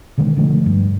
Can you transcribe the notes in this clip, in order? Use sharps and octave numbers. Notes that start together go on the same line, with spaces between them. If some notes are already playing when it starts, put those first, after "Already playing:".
B2 D3 D#3 G#3
D3 F3 G3 A3
G2